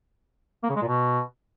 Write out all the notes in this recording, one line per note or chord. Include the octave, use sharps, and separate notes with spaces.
A#3
C#3
G#3
A#2
B2